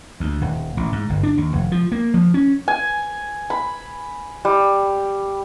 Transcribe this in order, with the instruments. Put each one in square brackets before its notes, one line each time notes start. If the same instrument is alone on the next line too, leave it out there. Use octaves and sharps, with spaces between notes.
[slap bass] D2
D#1
A1
G#2
G1
D4
D#2
F1
F3
A#3
F3
C#4
[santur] G#5
B5
G3